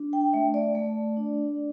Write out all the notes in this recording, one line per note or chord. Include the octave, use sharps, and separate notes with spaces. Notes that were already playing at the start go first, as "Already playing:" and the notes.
Already playing: D4
G5
A3 E5
D5
A3
D4